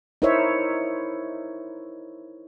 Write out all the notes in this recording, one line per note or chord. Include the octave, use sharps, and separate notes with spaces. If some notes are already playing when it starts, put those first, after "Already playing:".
D#4 E4 A#4 C5 C#5 E5